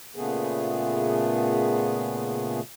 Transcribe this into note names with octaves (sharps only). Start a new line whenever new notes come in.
A#2 C#3 A3 B3 G#4